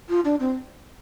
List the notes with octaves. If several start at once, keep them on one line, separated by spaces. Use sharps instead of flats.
F4
D4
C4